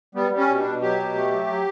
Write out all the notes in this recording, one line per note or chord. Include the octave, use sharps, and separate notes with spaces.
G3 B3
G3
C#4
B2
D4
B2
F#3 G4
B2
A3
F#3
F#3